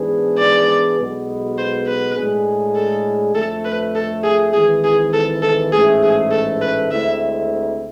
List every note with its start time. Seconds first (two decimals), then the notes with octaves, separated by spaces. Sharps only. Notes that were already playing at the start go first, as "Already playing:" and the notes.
Already playing: G#2 E3 B3 D4 G#4
0.39 D5
0.99 B1 B2 G#3 B3
1.58 C5
1.87 B4
2.17 A2 G#3 D4 G#4
2.75 A4
3.35 F2 D3 A3 A4
3.65 B4
3.95 A4
4.24 G#4
4.53 G#1 G#2 E3 G#4
4.84 G#4
5.13 A4
5.42 A4
5.72 A1 G#2 E3 A3 G#4
6.03 G#4
6.31 A4
6.61 B4
6.91 D2 D3 G#3 C4 E4 E5